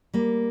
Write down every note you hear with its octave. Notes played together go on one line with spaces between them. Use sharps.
G3 A#3